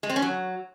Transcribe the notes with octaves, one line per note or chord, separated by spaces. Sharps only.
G#3
C4
C#4
F#3